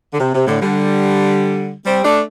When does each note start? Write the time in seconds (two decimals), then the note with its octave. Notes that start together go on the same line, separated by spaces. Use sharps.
0.14 D3
0.20 C3
0.35 C3
0.47 A2 D3
0.61 D3 G3
1.86 G3 C4
2.05 A3 D4